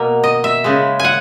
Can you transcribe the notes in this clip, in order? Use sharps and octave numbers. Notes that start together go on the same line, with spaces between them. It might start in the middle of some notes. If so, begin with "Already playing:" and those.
Already playing: B2 A#3
D#5
E5
C#3 G#3
F#5 G#5